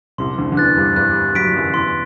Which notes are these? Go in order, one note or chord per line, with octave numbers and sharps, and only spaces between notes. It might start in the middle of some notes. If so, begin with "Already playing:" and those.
C2 C3 C6
D2 D3
D3
E2 E3 F#6 A6
G2 G3
G2 G3 F#6
F#3 B6 D7
E3
F#2 F#3
E2 E3 C6